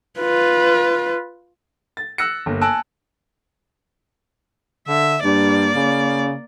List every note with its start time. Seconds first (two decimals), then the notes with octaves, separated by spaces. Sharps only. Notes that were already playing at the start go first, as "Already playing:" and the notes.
0.20 F4 B4
1.97 A6
2.18 E6 F#6 A#6 C#7
2.46 G1 A#3
2.61 G#5 A5 E6 F#6 A#6 D7
4.88 D3 E5
5.24 G2 A#3 D5
5.75 C#3